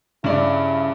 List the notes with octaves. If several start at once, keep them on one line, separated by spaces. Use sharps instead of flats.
G2 C#3 E4 D5